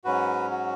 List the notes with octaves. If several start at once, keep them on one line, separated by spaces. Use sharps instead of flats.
G#2 F#3 C#4 F#4 B4
F#4